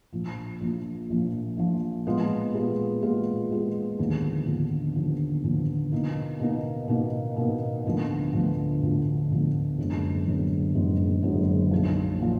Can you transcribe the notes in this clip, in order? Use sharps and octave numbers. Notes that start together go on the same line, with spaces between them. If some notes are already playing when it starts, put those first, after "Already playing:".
A#1 A#2 F3
A#1 A#2 F3
A#1 A#2 F3
A#1 A#2 F3
A#2 G#3 B3 F4 G#4
A#2 G#3 B3 F4 G#4
A#2 G#3 B3 F4 G#4
A#2 G#3 B3 F4 G#4
D#2 D3 F3 B3
D#2 D3 F3 B3
D#2 D3 F3 B3
D#2 D3 F3 B3
B2 A#3 D#4
B2 A#3 D#4
B2 A#3 D#4
B2 A#3 D#4
D2 D3 F3 B3
D2 D3 F3 B3
D2 D3 F3 B3
D2 D3 F3 B3
F#1 F#2 D3 G#3 B3
F#1 F#2 D3 G#3 B3
F#1 F#2 D3 G#3 B3
F#1 F#2 D3 G#3 B3
B1 A#2 F3
A#2 F3